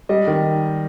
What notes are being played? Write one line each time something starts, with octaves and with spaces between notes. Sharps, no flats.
G3 D#5
D#3